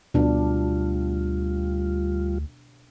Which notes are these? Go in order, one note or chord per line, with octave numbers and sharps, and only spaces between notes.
D2 B2 G3 D4 F4